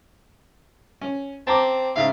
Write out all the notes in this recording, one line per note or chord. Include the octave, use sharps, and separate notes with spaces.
C#4
C4 A5 A#5 D6
G#2 C#3 E4 F5